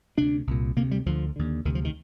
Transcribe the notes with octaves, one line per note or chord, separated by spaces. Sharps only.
D2 C3 D4
C2 A#2
D2 C3 A#3
G3
D2 D3 F3
D#2 D3
D2 C3 D#3
F3
D#3